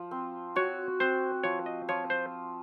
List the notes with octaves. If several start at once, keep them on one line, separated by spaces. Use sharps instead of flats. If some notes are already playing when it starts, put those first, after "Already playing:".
Already playing: F3
C4
F#4 C#5
C4 C5
F3 C#5
D#5
F3 C#5
C5